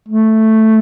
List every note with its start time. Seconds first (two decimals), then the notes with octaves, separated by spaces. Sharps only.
0.08 A3